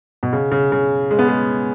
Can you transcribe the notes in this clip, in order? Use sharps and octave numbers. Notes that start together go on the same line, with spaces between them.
B2
C#3
C#3
C#3
G#3
B3
G#3